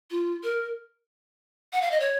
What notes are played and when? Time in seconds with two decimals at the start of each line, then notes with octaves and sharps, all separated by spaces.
0.11 F4
0.43 A#4
1.73 F#5
1.82 F5
1.91 D#5
2.00 C#5